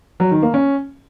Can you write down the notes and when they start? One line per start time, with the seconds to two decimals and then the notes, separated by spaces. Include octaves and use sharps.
0.20 F#3
0.31 D#3
0.42 A#3
0.54 C#4